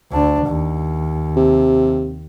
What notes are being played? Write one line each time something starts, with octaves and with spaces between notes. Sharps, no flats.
D2 D4
D#2
C3